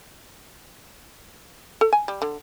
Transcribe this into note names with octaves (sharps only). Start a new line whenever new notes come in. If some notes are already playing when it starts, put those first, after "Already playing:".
A4
G#5
G3
D3